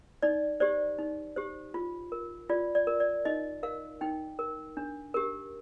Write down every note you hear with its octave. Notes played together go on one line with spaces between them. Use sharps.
D#4 D5
G4 C5 D5
D#4
G4 C5
F4
A#4
F4 D5
D5
A#4
D5
D#4 D#5
A#4 F5
D#4 G5
A#4
D4
G4 A#4